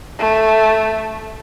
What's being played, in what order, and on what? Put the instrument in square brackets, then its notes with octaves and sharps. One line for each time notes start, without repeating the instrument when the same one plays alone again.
[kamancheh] A3